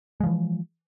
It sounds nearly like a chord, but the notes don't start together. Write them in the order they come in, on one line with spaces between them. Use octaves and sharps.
G#3 F3 E3